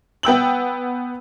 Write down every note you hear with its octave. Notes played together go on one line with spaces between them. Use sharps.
B3 G5 E6 F#7